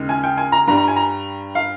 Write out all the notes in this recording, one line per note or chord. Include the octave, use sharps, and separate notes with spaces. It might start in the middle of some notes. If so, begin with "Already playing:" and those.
Already playing: D#2 C#3 G#3
G#5
G5
G#5
A#5
G2 G3 A#5
A#5
G#5
A#5
F5